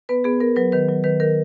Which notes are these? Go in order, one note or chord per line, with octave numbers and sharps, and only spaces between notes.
B3 B4
B3 G#4
B3 A#4
F#3 B4
D#3 B4
F#3
D#3 B4
D#3 A#4